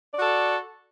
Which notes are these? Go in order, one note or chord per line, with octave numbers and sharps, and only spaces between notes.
F#4 A4 D5